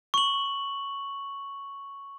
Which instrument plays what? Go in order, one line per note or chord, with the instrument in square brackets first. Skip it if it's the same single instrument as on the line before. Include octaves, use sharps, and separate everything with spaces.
[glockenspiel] C#6 F#7